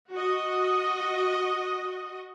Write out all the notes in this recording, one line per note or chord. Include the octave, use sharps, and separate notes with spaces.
F#4 D#5